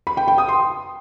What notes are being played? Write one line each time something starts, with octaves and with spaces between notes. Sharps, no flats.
B5
G5
G5
D#6
C6